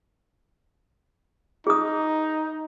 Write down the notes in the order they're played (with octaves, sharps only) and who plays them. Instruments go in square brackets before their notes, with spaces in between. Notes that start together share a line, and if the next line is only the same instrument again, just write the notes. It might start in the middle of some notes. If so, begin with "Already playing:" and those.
[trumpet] D#4 [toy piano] G#4 D#6